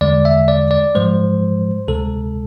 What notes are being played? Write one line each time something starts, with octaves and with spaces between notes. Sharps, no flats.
E2 D3 G#3 D5
E5
D5
D5
G#2 F3 G#3 C5
D2 C3 G#3 A4